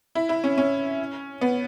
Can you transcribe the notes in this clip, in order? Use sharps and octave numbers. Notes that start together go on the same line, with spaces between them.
E4
E4
C#4
C#4
B3